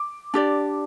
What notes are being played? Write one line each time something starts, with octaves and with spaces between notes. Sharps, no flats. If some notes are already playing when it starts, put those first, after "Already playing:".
Already playing: D6
D4 G4 D5